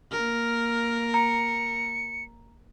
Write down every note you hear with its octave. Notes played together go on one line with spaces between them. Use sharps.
A#3 A#4 F6
A#5 C#7